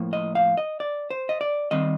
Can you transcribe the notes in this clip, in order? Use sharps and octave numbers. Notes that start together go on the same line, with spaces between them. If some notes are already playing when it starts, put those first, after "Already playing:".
Already playing: A2 F3 A#3
D#5
F5
D#5
D5
C5
D#5
D5
D#3 G3 C4 D#5